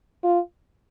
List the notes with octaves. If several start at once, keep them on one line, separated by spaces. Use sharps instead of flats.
F4